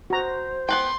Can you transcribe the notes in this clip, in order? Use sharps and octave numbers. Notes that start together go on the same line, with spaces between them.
F#4 C5 A#5
B3 B4 G5 C6